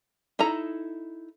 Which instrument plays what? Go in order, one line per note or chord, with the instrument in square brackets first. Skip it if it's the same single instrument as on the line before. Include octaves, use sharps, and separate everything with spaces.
[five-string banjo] D#4 E4 A4 A#5